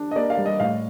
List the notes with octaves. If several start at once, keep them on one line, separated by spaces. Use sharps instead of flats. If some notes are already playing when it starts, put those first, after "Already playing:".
Already playing: D4
D#5
A#3 D5
F5
G3
D#5
A2 F5